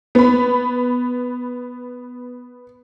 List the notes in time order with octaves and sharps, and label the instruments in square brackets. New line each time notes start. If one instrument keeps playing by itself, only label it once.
[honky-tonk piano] B3 B5